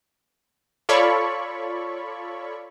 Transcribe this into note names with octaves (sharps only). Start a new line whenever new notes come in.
F4 A4 C#5 D5 B5 C#6